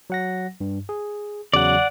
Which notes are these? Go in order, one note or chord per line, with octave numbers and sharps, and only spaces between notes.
F#3 F#5 A#6
G2
G#4
E2 C#3 F#3 D5 F#5